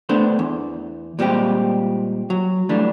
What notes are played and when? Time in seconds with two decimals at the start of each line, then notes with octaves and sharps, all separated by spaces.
0.09 A3 B3 D4 A4 C5
0.39 E2
1.19 A#2 G3 G#3 C4 G4
2.30 F#3
2.69 E3 G3 A3 D4